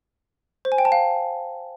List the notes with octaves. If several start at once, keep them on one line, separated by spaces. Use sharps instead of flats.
C5
G#5
G5
A5
F5